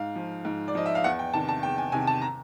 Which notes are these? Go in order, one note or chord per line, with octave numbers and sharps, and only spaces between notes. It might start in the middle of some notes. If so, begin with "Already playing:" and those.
Already playing: G#2 F5
F3
G#2
D5
F3 D#5
E5
F5
E2 F#5
G5
C3 D#3 A5
A5
E2 G5
G#5
C3 D#3 G#5
A5
A#5